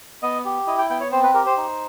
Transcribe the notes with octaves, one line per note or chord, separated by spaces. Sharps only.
B3 D#5
G4
E4 D#5
G5
B3 G5
C#5
C4 C5
B4
G4 A#4
C5
D#4